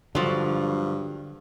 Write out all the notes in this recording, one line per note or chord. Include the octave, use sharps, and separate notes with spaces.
G2 D3 F3 F#3